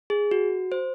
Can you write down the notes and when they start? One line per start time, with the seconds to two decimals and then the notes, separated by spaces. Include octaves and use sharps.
0.10 G#4
0.31 F#4
0.72 C5